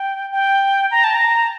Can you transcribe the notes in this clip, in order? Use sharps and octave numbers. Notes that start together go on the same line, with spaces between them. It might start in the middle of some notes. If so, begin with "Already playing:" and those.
Already playing: G5
G5
A#5
A5
A#5